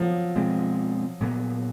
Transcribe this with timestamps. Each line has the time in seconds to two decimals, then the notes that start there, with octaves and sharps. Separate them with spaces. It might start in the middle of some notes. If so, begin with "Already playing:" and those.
Already playing: F3 F#3
0.36 B2 G#3 C4
1.20 A#2 F#3 B3